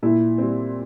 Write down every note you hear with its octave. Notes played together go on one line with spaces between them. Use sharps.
A#2 E4
G3 C4